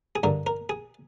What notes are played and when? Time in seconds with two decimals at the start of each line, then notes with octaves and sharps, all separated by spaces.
0.16 G#4
0.23 G2 D3 A#4
0.47 A#4
0.69 G#4